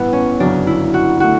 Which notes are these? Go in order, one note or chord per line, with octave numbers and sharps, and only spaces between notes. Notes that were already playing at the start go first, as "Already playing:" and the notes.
Already playing: A1 G2 E3 B3 E4
C#4
G1 F#2 C#3 F#3 D4
E4
F#4
D3 A3 F#4